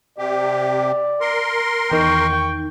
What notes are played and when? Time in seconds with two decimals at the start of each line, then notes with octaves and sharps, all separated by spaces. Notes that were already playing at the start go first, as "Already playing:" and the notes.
0.18 C3 G4 D5
1.21 A#4 C6
1.92 E2 D#3 G5 C#6